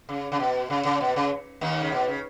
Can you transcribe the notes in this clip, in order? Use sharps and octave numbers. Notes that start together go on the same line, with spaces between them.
C#3
C#3
B2
C#3
C#3
B2
C#3
D#2 D#3
C#3
B2
C#3